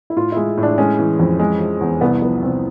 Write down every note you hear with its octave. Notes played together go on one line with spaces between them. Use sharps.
E4
A2 F4
G#3 E4
A2
D4
G#3 C#4
E3
F2
G#3
F3
E2
C2 B3
F3 B3
C2 C4